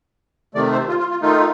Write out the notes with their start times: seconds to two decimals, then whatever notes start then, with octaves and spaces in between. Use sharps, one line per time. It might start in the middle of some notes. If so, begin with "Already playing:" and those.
0.55 C3 D#3 A3 D5
0.72 C5
0.88 F4
0.99 F4
1.10 F4
1.21 D#3 A3 D#4 F4